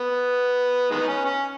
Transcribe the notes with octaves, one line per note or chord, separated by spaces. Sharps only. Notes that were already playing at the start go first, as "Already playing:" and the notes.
Already playing: B3
D#3 G#3 B3
D#4
C#4
C#4